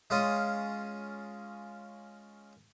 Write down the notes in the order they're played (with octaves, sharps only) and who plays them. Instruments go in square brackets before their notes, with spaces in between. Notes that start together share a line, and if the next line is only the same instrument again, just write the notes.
[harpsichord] G#3 C#4 F4 D#6